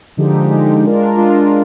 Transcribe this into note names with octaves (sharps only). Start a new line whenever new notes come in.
D3 F3 G#3 D#4 G4
D3 F3 G#3 D#4 G4
G#3 D4 F4 A#4
G#3 D4 F4 A#4